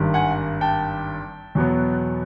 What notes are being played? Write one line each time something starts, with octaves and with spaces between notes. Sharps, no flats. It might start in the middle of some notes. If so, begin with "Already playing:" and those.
Already playing: G#1 G2 D#3 G3
F#5 G#5
G5 A5
E2 B2 F#3 B3